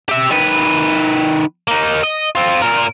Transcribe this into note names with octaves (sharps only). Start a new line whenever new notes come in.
G4 E5
D#3 B4
A#3 D#4
D#5
C4 F4
A#2 A#4